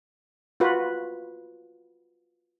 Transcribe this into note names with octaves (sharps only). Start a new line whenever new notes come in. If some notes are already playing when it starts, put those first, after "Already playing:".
F4 F#4 B4